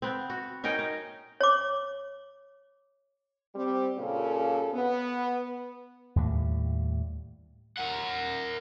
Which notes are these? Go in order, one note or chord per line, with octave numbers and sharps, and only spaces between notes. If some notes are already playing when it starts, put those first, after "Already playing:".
B3 C4
F#4
C#4 D#4 A#4 G5
D#4
C#5 D6
G3 C4
A#2 C#3 G3 C#4 A4
B3
D#2 A2 G3
A#4 F#5